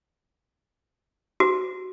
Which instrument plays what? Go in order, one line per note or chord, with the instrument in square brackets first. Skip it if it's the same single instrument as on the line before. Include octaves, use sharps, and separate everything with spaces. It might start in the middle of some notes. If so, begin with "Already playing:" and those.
[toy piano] F#4